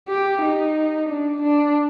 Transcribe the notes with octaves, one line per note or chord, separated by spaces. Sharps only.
G4
D#4
D4
D4